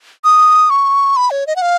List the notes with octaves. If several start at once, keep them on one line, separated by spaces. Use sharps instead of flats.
D#6
C#6
B5
C#5
D#5
F#5
F5